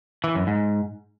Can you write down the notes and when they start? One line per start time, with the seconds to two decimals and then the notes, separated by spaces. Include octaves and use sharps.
0.24 E3
0.35 F#2
0.47 G#2